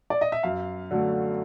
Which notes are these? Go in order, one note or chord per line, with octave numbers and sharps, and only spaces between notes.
D5
D#5
E5
F#2 F5
D3 F#3 A3